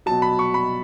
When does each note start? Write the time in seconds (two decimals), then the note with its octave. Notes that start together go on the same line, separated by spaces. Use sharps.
0.06 B2 F#3 A5
0.22 B5
0.39 C#6
0.54 B5